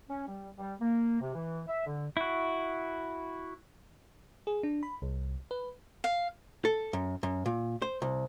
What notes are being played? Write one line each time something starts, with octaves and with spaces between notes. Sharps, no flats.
C#4
G3
G3
A#3
C3
E3
E5
D3
E4 F#4
G#4
D4
B5
C2
B4
F5
A4
F#2
F#2
A#2
C5
C2